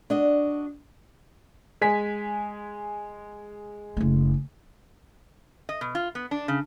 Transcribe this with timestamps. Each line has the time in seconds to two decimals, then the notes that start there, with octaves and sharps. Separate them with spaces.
0.10 D4 F#4 D#5
1.81 G#3 G#5 B6
3.97 F#1 A3
5.69 D#5
5.81 B2
5.95 F4
6.15 B3
6.31 D4
6.48 C#3